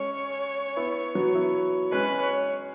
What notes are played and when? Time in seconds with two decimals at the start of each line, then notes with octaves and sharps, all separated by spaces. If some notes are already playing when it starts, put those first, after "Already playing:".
Already playing: G#3 C#4 C#5
0.76 B3 E4
1.15 F#3 B3
1.34 B3 E4
1.92 G#3 C#4 B4
2.21 C#5